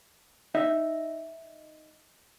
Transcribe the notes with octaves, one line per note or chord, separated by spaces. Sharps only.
D#4 D#5 E5